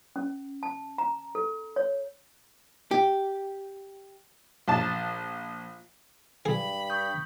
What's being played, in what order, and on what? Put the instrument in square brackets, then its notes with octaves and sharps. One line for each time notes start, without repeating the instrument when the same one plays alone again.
[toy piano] C#4
A5
A#5
A4
C#5
[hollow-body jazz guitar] G4
[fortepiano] A#1 A5
[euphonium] G2 [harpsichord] G#4 [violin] B5
[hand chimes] C#6 D#6 G6